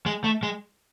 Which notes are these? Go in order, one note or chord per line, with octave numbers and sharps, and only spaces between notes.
G#3
A3
G#3